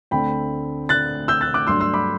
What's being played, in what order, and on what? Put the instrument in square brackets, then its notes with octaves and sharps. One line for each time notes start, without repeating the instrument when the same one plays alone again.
[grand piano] D2 D3 A3 C4 G5 B5
F#6 A6
E6 G6
F#6 A6
D6 F#6
G2 F#3 A3 D4 C6 E6
C6 E6
B5 D6